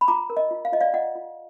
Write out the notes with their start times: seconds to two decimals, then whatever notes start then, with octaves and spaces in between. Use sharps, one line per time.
0.01 B5
0.08 F4 A#5 D6
0.30 A#4
0.37 D#5
0.51 F4
0.65 F5
0.72 F4 D#5
0.81 D5 F5
0.93 F4 D#5 F#5
1.15 F4